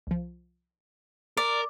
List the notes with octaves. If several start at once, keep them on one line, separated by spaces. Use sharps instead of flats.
C2 F3
A#4 D5